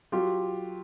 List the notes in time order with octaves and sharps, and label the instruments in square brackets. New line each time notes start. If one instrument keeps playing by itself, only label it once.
[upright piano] F#3 F4 G4